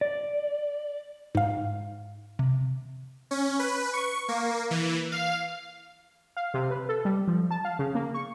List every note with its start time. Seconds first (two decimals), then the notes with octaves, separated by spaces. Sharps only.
0.01 D5
1.35 G#2 F5
2.39 C3
3.31 C#4
3.59 B4
3.93 C#6
4.28 A#3
4.71 E3
5.12 F5
6.37 F5
6.54 C3
6.71 B4
6.89 A4
7.05 G3
7.28 F3
7.51 A5
7.65 F5
7.79 C#3
7.95 A#3
8.14 C#6